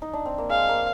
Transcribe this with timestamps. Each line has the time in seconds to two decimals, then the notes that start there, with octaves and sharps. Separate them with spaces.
0.02 D#4
0.13 D4
0.26 C4
0.38 A#3
0.50 G#3 F5
0.69 A#3